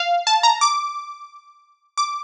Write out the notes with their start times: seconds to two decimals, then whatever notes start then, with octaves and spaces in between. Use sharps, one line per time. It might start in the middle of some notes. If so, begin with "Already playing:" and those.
Already playing: F5
0.27 A5
0.43 A#5
0.61 D6
1.98 D6